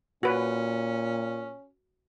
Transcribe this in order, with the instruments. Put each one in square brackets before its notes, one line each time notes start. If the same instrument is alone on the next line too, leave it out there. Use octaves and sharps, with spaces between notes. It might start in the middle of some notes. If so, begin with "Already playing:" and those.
[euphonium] A#2 [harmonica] C#4 [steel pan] F#4 B4